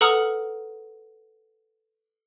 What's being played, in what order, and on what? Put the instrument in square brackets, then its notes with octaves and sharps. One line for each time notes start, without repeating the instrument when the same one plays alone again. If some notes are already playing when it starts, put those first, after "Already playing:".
[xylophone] A4 B4 F#5 A#5 D#6 F6